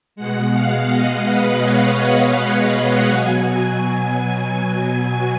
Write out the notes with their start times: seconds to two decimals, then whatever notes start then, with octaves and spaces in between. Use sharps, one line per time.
0.16 B2 G#3 F#5
0.52 F5
0.90 D#5
1.25 B4
1.61 C#5
2.71 F#5
3.06 B2 F#3 G#5